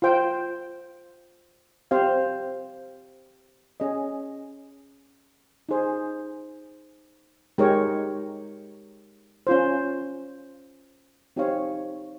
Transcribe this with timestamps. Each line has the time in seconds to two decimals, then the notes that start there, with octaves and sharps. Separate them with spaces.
0.02 F4 C5 G5
1.91 C4 G4 C5 F5
3.80 C#4 G#4 D#5
5.69 D#4 G#4 C5
7.58 G#3 D#4 G4 A#4 C#5
9.47 C#4 F4 C5
11.36 C4 D#4 G4 C#5 F5